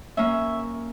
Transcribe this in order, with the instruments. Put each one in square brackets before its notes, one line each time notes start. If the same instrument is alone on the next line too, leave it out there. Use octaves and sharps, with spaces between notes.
[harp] A#3 C#4 [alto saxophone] E5